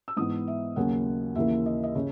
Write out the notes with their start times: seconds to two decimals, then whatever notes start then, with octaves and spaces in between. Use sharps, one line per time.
0.08 E6
0.17 G#2 E3 B3 D#6
0.47 E5
0.76 D#2 C#3 F#3 A#3 C#4 F#5
1.35 D#2 C#3 E3 A#3 E5
1.66 D#5
1.83 D#5
1.95 C#3 C#5